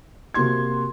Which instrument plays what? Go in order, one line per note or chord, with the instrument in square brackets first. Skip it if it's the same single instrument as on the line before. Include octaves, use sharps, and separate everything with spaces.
[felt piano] C3 A#3 F#4 C6 G#6